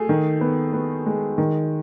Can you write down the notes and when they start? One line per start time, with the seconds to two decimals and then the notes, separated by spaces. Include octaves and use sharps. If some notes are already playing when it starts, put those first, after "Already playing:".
Already playing: A3 G#4
0.09 D#3
0.41 B3
0.73 B3
1.06 G#3
1.38 D#3